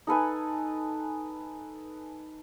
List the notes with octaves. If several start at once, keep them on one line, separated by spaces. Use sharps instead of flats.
D#4 A4 B4 G#5